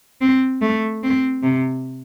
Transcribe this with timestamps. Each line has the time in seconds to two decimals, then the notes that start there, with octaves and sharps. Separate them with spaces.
0.21 C4
0.62 A3
1.03 C4
1.43 C3